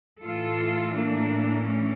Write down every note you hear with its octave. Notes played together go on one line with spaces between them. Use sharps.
A2 E3 F4 A4
A#3 D4
A3 C#4